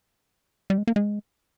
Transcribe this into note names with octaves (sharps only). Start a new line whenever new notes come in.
G3
G#3
A#3
G#3